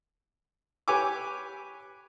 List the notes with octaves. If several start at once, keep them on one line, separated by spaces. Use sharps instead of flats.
G4 B4 C#5 G#5 D6